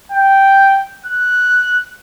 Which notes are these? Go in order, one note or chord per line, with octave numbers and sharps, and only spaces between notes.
G5
F#6